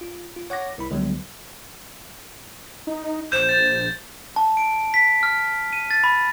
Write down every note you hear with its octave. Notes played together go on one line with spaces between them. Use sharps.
F4
F4
C#5 F#5 D6 A#6
C2 E4 B5
C#2 D3 F#3 G3 B3
D#4
A#1 C5 G6 E7
A6
A5
D7
B6
F6
D#7
A6
B5